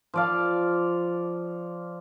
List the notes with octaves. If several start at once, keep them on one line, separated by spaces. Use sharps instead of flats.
F3 D5 F5